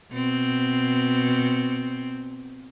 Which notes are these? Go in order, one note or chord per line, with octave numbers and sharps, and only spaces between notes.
B2 C4